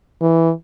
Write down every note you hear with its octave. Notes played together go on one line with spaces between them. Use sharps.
E3